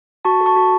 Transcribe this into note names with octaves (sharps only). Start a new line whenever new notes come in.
F#4 A5 C#6
A4
A5 C#6
F#4